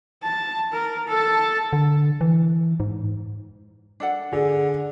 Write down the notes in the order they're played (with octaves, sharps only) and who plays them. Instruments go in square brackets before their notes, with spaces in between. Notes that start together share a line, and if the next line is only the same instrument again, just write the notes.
[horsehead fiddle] A5
A#4
A4 A5
[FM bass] D3
E3
G#2
[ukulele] D4 A4 F#5
[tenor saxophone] D3 [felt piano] G#4